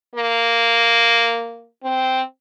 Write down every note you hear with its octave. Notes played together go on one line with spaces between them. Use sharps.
A#3
C4